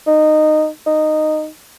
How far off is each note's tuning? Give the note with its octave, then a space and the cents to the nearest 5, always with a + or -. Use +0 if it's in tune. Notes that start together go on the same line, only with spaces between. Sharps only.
D#4 -15
D#4 -10